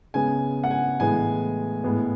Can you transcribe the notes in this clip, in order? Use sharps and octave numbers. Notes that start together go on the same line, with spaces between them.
C#3 G#3 B3 G#5
F#5
G#5
A2 E3 G#3 B3 G#5
A2 G#3 B3